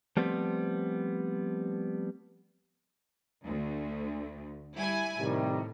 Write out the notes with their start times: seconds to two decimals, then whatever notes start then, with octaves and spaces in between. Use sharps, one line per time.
0.17 F3 G3 A3 B3 C4
3.45 D2
4.75 G3 E4 G#5
5.19 A2 C3 D#3 G3